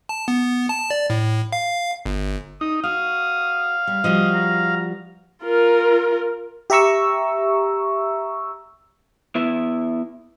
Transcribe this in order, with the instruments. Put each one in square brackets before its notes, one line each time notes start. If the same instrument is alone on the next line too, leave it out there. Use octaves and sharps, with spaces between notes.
[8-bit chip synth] A5
B3
A5
D5
A2
F5
G1
[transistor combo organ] D#4 [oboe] D#6
[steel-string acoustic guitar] F#4 [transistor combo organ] F5 [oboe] D#6
[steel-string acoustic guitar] G3
[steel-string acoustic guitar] F3 G3 F#4 [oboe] D#5
[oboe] A#5
[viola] F4 A#4
[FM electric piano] G4 E5 A#5 C#6 E6
[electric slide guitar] B3 E4 E5